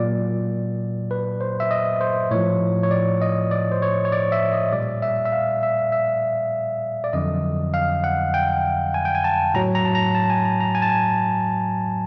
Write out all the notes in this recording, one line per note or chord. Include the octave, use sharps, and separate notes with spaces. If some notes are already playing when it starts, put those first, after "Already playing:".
Already playing: A#2 F#3 D5
B4
C5
E5
D#5
C5
A2 F3 C#5
C#5
D5
D#5
D5
C5
C#5
C#5
D5
E5
D#5
A#2 G3 D5
E5
E5
F5
E5
E5
D5
F2 D3 F#3 D#5
F5
F#5
G5
G#5
G5
G#5
A5
A2 F#3 A#5
A#5
A5
A#5
A5
G#5
A#5
A#5
G#5
A5
G#5